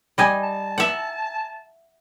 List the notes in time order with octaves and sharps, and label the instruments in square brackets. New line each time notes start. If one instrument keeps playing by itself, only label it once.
[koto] G3 D#5 G#5
[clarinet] A5
[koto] E5 F#5